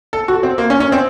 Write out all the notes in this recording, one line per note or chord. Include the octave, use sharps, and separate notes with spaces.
A4
F#4
C4
A#3
C#4
C#4
C4